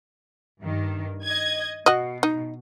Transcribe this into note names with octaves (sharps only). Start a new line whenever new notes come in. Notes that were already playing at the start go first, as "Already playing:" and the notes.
G2 D#3
D#5 G#6
B2 F#4 D#5
D#4